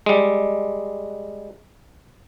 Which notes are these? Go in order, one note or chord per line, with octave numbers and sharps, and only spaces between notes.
G3 G#3